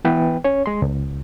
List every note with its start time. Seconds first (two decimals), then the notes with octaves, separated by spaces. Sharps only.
0.05 E3 B3 B4 G5
0.44 C#4 C#5
0.66 G#3 C6
0.82 C#2